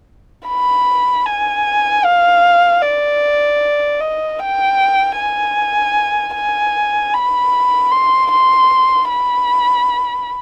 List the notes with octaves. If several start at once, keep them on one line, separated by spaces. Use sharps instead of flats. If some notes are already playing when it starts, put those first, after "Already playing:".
B5
G#5
F5
D5
D#5
G5
G#5
G#5
B5
C6
C6
B5